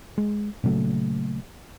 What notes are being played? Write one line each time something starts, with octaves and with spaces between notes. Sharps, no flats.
G#3
A#2 C#3 F#3 A3